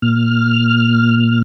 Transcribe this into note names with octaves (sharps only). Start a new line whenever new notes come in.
A#2 F6